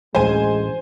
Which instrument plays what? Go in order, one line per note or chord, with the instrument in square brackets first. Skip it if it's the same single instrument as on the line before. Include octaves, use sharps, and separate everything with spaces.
[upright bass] A1 D2 [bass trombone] G#3 [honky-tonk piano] C5 G#5